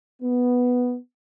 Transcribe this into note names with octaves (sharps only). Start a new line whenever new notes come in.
B3